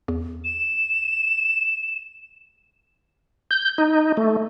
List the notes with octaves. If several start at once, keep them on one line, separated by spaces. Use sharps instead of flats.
E2
E7
G6
D#4
A3